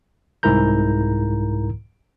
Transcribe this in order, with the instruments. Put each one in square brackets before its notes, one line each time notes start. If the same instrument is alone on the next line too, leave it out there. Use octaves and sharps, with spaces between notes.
[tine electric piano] C2 G#2 E4 A#4 A#5 G6